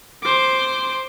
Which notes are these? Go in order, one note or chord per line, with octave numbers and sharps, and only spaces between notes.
C5 D6